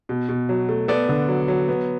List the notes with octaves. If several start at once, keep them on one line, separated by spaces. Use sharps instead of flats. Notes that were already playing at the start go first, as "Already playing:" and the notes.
B2
B2
F#3
A3
B3 A4 D5
D3
F#3
F#3
B3